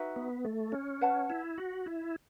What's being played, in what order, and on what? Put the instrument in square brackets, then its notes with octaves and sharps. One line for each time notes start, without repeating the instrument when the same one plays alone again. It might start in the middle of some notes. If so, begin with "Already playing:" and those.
Already playing: [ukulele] D#4 F#4 B4 E5
[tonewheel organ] B3
A3
C#4
[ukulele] B4 F#5 A5
[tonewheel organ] E4
F#4
E4